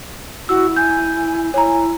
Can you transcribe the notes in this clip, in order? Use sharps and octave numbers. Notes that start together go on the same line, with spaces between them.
E4 F#4 E6
G#5 G6
E4 C#5 G#5 A#5